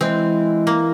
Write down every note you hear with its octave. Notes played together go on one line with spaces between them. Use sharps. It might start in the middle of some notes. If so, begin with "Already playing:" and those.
E3 G#3 C4
A#3